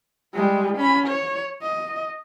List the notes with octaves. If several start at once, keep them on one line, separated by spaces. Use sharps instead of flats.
G3 G#3
C#4 B5
C#5
D#5